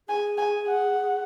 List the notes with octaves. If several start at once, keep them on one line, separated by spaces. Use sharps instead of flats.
G#4 G#5
G#5
F#5